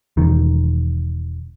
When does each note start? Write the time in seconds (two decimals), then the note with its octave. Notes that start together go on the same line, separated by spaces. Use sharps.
0.17 E1 D#3